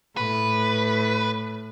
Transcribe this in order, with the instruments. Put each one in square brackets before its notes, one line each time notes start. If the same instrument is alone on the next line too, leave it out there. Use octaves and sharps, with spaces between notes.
[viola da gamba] A2 [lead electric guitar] B4